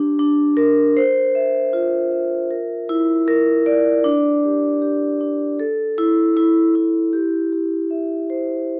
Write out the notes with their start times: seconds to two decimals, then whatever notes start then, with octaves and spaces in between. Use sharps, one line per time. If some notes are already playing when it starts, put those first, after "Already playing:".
Already playing: D4 G4
0.19 D4
0.57 A#4
0.97 C5
1.35 E5
1.73 F4
2.12 E5
2.51 A#4
2.89 E4
3.28 A#4
3.66 D5
4.04 D4
4.44 G4
4.82 G4
5.21 D4
5.60 A4
5.98 E4
6.37 E4
6.75 E4
7.13 G4
7.53 G4
7.91 E5
8.30 C5